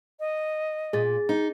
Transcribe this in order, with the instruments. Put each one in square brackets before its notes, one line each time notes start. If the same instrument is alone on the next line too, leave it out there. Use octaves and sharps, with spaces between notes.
[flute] D#5
[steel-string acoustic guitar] A#2 [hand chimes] G#4 A6
[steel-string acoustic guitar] D#4